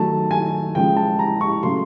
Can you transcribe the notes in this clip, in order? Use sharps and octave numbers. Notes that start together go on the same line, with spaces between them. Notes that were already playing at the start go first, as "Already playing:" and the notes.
Already playing: D#3 F#3 A3 A5
G#5
C#3 F3 G#3 G5
A5
A#5
C#6
C#3 F#3 A3 C6